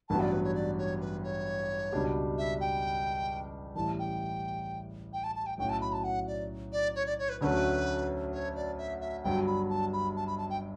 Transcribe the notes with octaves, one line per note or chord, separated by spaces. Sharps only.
A1 G2 F#3 B3 A5
D5
B4
C#5
D5
C#5
B4
C#5
C#2 B2 G3 D4 G4
E5
G5
A1 A2 E3 G3 A5
G5
G5
A5
A5
G5
B1 A2 F#3 C#4 F#4 G5
A5
B5
A5
F#5
D5
D5
C#5
D5
C#5
B4
D2 D3 F#3 A3 C#4 B4 C#5
C#5
D5
E5
E5
G1 G2 F#3 G5
B5
A5
B5
A5
B5
A5
G5